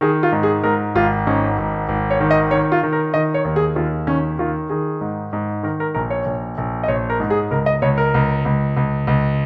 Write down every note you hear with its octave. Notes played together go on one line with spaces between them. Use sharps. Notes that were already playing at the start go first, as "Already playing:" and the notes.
D#3 G#4
F4
G#2
G#4
G#2 A#4
G#1 F4
G#2 C#4
G#1
G#1
C#5
D#3
D#5
D#3 C#5
F4
D#3
A#4
D#3 D#5
C#5
D#2
G#4
D#2 F4
D#3 C#4
D#3 F4
D#3 G#4
G#2
G#2
D#3 A#4
A#4
A#1 A#4
C#5
A#1
A#1
D#5
A#1 C#5
A#4
G#2
G#4
C#2 A#4
D#5
C#2 C#5
A#4
C#2
C#2
C#2
C#2